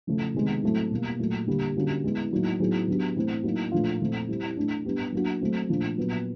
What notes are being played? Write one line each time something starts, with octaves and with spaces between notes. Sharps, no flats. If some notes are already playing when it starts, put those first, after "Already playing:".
C#3 F3 A3
C3 D#3 G#3 B3
A2 F#3 A3 C4
B2 G3 A#3
A#2 F#3 A3
D3 G3 A#3
D3 G3 A#3 C#4 F#4
G#3 B3 E4 G#4
A2 F#3 A#3 D#4
A2 F#3 B3 D#4 G#4
F#3 B3 D4 G4
A2 E3 A3 C4
A2 F#3 A#3 D#4 F#4
A#2 F3 A3 D4 F4
A#2 F3 A3 C4
G3 C4 E4
E3 A3 D4
G3 B3 D4 G4
F#3 A#3 D4 F#4
F#3 A3 C4
A#2 F3 A3 D4
A#2 F#3 B3